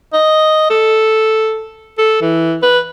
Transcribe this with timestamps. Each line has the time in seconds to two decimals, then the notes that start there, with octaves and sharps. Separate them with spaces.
0.13 D#5
0.70 A4
1.98 A4
2.21 E3
2.62 B4